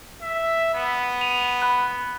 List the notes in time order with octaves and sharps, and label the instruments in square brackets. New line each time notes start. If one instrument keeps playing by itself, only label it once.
[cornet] E5
B3
[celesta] D#7 F7
B5 F#6